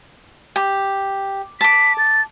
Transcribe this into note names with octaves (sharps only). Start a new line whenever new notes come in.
G4
A5 D6 B6
A6